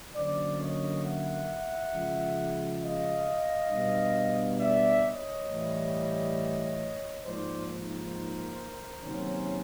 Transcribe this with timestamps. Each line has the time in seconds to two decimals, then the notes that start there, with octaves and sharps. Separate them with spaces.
0.16 D3 F#3 A#3 C#4 C5 D5
0.60 C#5 D#5
1.05 E5 F#5
1.93 C#3 F3 G#3
2.81 D#5 F5
3.71 B2 G3 B3 D4
4.59 D5 E5
5.03 C#5 D#5
5.48 A2 E3 G3
7.25 G#2 F3 A#3 D#4 C5 D5
7.69 A#4 C5
9.02 C3 D#3 F#3 A#3 C#4